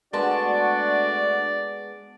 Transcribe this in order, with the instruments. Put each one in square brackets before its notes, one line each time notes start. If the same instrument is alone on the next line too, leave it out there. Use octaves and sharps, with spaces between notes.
[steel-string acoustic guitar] G#3 B3 A5 [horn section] A3 D4 F#4 [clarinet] D5